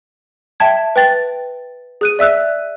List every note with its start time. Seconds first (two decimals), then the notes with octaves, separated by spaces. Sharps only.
0.60 E5 G5 A5 G#6
0.96 B4 G5 A6
2.01 G#4 F#6 D#7
2.19 D5 E5 E6 F#6